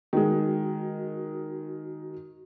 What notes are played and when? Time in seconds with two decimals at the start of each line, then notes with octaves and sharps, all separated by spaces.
0.13 D#3 G#3 F#4